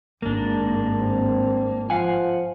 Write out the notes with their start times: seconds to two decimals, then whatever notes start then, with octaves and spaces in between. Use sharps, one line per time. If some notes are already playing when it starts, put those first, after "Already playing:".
0.22 G#1 G2 A#3 D4
1.00 C4
1.90 F3 F5 F#5 G#5